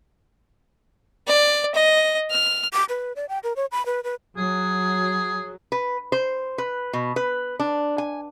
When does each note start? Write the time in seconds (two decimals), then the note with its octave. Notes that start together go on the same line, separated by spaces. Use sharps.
1.27 D5
1.75 D#5
2.31 F6
2.73 D6
2.89 B4
3.16 D5
3.29 G5
3.43 A#4
3.56 C#5
3.72 B5
3.86 B4
4.04 B4
4.37 F#3 G#4
5.72 B4
6.12 C5
6.58 B4
6.93 B2
7.16 B4
7.60 D4
7.98 G#5